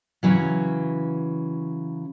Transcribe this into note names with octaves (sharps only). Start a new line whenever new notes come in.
C#3 E3 F#3